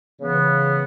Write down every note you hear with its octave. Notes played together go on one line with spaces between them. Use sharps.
C#3 E3 B3